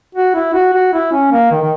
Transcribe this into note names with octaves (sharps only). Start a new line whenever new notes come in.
F#4
E4
F#4
F#4
E4
C#4
A#3
D#3
D#3